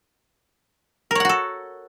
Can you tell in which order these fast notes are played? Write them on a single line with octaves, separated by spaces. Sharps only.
A#4 C#5 F#5 F#4 A4